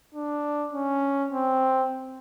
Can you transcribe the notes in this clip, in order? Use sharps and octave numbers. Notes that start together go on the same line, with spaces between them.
D4
C#4
C4